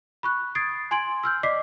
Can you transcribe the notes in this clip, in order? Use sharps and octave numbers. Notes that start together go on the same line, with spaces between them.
B5 C#6 F#6
D#6 G#6 A6 C7 D7
G#5 C6 G#6 D7 F#7
E6 F6 G6
D5 D#5 D6 B6 C7